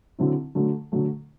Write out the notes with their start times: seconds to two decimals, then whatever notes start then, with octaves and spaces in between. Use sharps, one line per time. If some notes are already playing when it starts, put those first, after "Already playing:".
0.19 D3 F#3 C4 E4
0.55 D3 F#3 A3
0.92 D3 F#3 A3